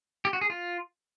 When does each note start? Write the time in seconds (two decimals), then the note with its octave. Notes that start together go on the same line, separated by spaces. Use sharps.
0.25 G4
0.33 F#4
0.41 G#4
0.50 F4